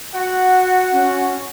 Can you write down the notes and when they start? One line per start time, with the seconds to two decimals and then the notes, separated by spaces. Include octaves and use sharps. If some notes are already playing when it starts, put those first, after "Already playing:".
0.14 F#4 F#5
0.92 C#4